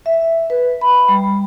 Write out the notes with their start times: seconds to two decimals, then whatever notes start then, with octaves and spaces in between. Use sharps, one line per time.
0.06 E5
0.50 B4
0.81 B5
1.08 G3